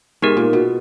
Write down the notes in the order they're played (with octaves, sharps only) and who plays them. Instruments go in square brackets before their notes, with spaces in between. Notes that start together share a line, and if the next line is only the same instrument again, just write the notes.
[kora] G#2 [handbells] B3 D#4 G4 A#4
[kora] A#2
B2